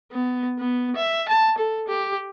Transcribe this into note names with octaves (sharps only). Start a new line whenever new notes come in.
B3
B3
E5
A5
A4
G4